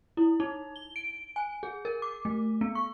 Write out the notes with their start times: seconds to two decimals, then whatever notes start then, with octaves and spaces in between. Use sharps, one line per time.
0.17 E4
0.40 D#4
0.76 G7
0.96 D7
1.36 G#5
1.63 G#4
1.85 A#4
2.02 D6
2.25 A3
2.61 B3
2.75 C#6